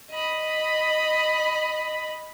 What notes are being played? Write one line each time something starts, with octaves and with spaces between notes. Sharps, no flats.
D#5 B5